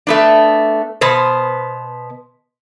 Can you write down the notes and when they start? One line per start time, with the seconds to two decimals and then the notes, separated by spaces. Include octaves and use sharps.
0.07 A3 B3 D4
1.01 B2 B3 C5